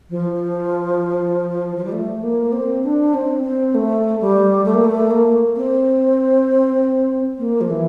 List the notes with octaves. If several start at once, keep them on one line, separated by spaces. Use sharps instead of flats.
F3
F3
G3
A3
A#3
C4
D4
C4
C4
A3
G3
A3
A#3
A3
A#3
C4
A#3
F3
E3